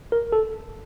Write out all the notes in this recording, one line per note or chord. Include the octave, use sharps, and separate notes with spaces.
A#4
A4